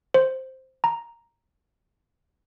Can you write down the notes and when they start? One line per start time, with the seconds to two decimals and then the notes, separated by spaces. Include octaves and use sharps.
0.14 C5
0.84 A#5